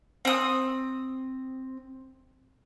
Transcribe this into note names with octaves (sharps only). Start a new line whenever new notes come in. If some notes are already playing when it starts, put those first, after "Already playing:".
C4 D#6